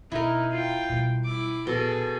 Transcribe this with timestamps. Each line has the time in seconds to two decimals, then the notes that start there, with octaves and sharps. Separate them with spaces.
0.12 B2 D#4 E4 A#4
0.51 F4 G5
0.89 B2 G3
1.25 E4 D6
1.67 A#1 B2 G#4 A4